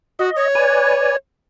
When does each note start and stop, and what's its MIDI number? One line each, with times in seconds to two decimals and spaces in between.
0.19 0.30 66
0.19 0.48 75
0.36 1.16 73
0.55 1.16 71
0.55 1.16 74
0.55 1.16 80